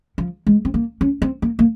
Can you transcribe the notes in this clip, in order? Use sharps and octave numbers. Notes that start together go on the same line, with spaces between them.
F3
G#3
C4
A#3
C#4
C4
A#3
A#3